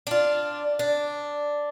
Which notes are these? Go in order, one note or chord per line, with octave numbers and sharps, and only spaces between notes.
D4 F4
D4